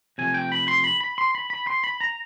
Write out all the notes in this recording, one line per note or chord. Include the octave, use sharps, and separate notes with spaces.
C3 F3 A3 G#5
G5
B5
C6
B5
B5
C6
B5
B5
C6
B5
A#5